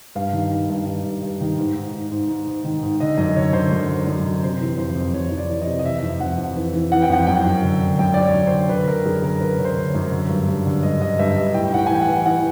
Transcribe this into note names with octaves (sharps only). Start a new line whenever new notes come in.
G2 F5
D#3
D#3
G2
D#3
G2
G2
D#3
G#2
G#2
G#2
G#2
G#2
G#2
D#3
G#2
D3 D#5
F#2 D#5
D3 C#5
D3 C5
F#2
D3
F#2
D3
C3 C5
E3
F2 C5
F2
F2 C#5
F2
D5
E3
D#5
C3
D#5
E3 E5
F2
F2 F#5
F2
E3
E3
E3 F#5
G5
F2 F#5
F#2 G5
F#2
D3
D3
F#2 G5
F#2 D5
C#5
F#2
C5
D3
D3 B4
D3 A#4
F#2 G#4
D3 A#4
D3 B4
D3 C#5
C5
D3
C#5
F#2
D3
G2
G2
D3
G2 D#5
D3 D#5
G2 E5
G2 D#5
A2 G5
A2 F#5
G5
G#5
E3 G5
F#5
E3
E3 F#5